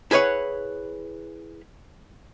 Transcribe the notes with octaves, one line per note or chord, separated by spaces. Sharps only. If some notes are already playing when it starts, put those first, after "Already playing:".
E4 G#4 B4 C#5 F#5